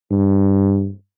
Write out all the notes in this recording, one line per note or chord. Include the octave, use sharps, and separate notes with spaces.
G2